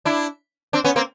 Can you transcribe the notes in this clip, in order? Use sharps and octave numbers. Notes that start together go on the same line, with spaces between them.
D4 E4
C4 D4
B3 C#4
A#3 C4